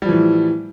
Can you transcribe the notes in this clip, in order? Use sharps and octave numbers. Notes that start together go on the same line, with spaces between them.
A2 E3 F3 G3